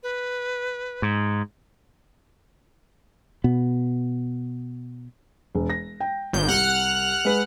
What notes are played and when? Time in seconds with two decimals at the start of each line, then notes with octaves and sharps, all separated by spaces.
0.03 B4
1.02 G#2
3.44 B2 B3
5.55 E1
5.70 A#6
6.00 G5
6.33 G#1 G6
6.49 C2 F#5 F6 F#6
7.25 G#3 B4